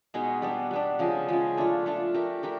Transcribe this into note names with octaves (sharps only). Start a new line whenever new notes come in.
B2 G#3 B3 D#4
G3 B3 D4
G3 B3 D4
C#3 F3 G#3
C#3 F3 G#3
A3 D4 F4
A3 D4 F4
A3 D4 G4 A#4
A3 D4 G4 A#4